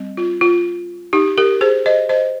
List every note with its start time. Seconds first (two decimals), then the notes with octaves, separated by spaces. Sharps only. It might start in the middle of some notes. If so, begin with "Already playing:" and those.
Already playing: G3 C4
0.17 F4
0.41 F4
1.13 D#4 G4
1.38 G4 A#4
1.61 G#4 C5
1.86 C5 D#5
2.09 C5 D#5